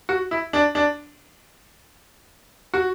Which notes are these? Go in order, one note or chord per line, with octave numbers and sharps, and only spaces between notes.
F#4
E4
D4
D4
F#4